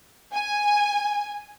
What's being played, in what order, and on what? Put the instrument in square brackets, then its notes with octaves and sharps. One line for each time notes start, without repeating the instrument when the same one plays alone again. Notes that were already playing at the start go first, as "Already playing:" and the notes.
[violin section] G#5